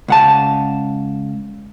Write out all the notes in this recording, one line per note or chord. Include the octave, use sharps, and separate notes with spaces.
C#2 F#5 A5